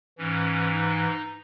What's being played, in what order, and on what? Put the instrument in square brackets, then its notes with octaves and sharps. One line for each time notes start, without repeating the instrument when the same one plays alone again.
[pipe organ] G#2 E3 C#4
D#4